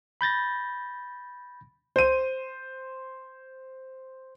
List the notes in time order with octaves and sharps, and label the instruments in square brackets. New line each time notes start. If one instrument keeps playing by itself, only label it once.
[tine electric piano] B5 G6 A6 A#6
[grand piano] C5 D#7